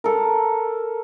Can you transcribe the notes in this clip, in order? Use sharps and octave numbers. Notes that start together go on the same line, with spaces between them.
A4 A#4